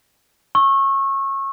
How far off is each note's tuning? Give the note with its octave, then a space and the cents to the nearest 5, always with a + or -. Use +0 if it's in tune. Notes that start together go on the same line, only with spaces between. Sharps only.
C#6 -25 E6 +0